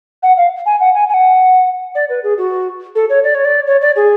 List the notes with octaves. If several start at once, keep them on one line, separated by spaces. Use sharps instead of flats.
F#5
F5
G#5
F#5
G#5
G#5
F#5
D5
B4
G#4
F#4
A4
C#5
D5
C#5
D5
C#5
D5
G#4